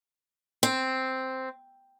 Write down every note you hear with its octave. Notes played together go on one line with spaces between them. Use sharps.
C4